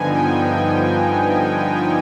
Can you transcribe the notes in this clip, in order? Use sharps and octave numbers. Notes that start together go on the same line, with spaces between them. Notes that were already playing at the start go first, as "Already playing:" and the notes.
Already playing: G2 D3 F3 B3 D#4 G#5
G5
G5